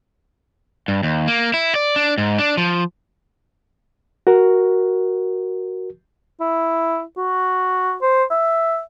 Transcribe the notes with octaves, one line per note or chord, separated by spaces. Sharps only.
G2
D#2
A#3
E4
D5
D4
G#2
D4
F3
F#4 A#4
E4
F#4
C5
E5